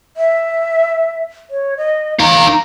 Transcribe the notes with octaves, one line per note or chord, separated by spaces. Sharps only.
E5
C#5
D#5
D#4 F5 A#5